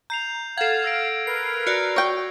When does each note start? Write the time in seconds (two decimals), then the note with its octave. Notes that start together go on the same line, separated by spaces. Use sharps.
0.10 A#5 G6 C7 F7
0.57 A4 F5 F#5 G#6 C7
0.84 E6 A#6 D7
1.27 A#4 B4 A#5 C7
1.67 F#4 D5 C7
1.96 C#5 G5